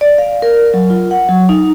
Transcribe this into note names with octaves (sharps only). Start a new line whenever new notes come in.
D5
F5
A#4
F#3
F4
F#5
F#3
D#4